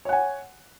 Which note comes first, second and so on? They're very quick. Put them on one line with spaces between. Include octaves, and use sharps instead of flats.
C#5 F#5 G#5